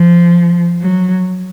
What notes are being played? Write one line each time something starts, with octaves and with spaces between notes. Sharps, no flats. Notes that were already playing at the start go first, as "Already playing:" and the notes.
Already playing: F3
F#3